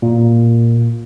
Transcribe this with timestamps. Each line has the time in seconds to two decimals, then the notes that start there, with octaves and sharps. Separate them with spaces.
0.02 A#2